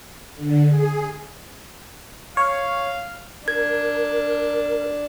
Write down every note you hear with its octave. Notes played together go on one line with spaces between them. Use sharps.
D3
G#4
C#5 F5
D4 A#4 G#6